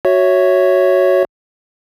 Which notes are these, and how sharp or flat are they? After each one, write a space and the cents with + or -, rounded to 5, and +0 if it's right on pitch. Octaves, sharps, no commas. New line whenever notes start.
F#4 +0 C#5 +0 E5 +0